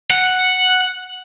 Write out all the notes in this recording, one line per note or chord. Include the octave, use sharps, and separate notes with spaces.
F#5